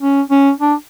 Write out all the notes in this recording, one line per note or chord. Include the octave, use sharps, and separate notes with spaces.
C#4
C#4
D4